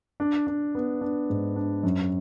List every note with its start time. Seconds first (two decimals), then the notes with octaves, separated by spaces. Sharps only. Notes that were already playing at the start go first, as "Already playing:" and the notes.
0.20 D4
0.47 D4
0.75 B3
1.01 D4
1.30 G#2
1.56 D4
1.83 F#2